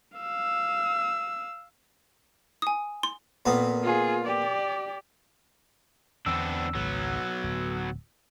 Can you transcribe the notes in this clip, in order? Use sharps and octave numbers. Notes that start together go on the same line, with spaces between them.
F5 E6
G#5 D#6
C6
F2 A#2 B3
F4 G#4
G4 D5
E2 D3 B3 C4 D4 E6
G#1 C#2 F#3 B3
D1